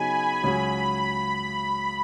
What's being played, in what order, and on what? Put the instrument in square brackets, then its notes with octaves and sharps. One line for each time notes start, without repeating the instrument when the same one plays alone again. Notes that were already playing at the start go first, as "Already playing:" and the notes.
Already playing: [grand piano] C#3 F#3 B3 D#4 G#4 [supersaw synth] G#5 B5
[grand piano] C#2 C#3 F#3 [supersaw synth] B5